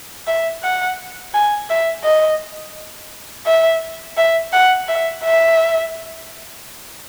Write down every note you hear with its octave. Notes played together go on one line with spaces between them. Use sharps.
E5
F#5
G#5
E5
D#5
E5
E5
F#5
E5
E5